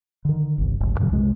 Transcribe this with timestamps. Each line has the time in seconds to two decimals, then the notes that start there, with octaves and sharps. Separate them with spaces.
0.25 D3 D#3
0.58 G1 C2
0.81 G1 C#2 F#2 A2
0.99 F#2 A#2 C#3 F#3
1.11 C2 F#2 C3 G#3